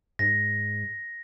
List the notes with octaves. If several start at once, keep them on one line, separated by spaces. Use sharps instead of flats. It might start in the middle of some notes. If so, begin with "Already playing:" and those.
G#2 A#6